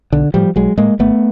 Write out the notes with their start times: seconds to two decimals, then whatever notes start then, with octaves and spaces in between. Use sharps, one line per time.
0.12 B1 D3
0.34 A2 F3 G3
0.56 B1 F#3 G#3
0.77 A2 G#3 A#3
0.99 G#1 A3 B3